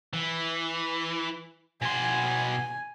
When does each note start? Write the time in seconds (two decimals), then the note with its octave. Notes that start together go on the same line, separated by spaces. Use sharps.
0.13 E3
1.82 B2 G#5 C6